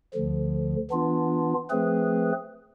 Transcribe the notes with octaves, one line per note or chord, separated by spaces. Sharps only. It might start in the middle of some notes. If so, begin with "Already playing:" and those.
D2 D3 F3
E3 B3 D4 F4
F3 A3 C4 G#4 B4